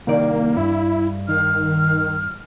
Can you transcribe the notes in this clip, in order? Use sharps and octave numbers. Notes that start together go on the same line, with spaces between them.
C2 D#3 A#3 D5
G2 E4
D#3 F6